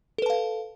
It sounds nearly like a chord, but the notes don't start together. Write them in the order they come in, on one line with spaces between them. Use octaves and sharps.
A4 B4 A5 F5